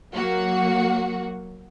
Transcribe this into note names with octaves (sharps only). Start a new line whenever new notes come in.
F#3 A#3 F#4